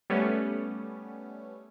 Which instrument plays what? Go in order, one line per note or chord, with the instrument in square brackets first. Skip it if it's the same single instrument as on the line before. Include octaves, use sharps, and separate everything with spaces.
[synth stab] G3 A3 B3 C#4